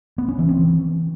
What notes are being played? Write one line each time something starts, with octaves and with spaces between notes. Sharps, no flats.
B3
C#4
E3
C4
E3